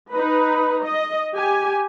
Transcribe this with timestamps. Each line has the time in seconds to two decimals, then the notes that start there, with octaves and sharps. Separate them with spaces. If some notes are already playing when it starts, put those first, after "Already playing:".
0.13 D#4 B4
0.85 D#5
1.36 G4 G#5